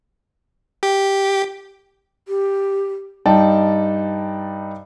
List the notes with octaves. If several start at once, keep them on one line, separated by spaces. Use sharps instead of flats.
G4
G4
G2 D#4 D5 G5 A5